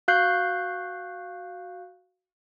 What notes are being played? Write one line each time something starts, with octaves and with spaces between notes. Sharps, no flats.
F#4 F5 F#6 G6 C7